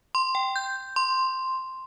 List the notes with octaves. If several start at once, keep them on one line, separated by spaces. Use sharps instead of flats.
C6
G5
G6
C6